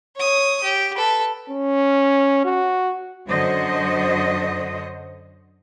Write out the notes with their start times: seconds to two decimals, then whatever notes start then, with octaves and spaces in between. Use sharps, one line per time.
0.17 C#5 D#6
0.64 G4
0.96 A4 B4
1.50 C#4
2.45 F#4
3.29 F#2 D3 F#3 F#4 C5 D#5